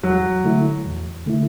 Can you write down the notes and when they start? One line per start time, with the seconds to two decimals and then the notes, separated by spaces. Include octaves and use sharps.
0.03 E2 F#3
0.44 D3 A3 E4
0.85 E2
1.26 D3 A3 E4